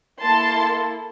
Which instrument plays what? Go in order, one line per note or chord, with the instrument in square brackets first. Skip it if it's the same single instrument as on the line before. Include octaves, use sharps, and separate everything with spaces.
[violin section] A#3 E4 A4 A5 C6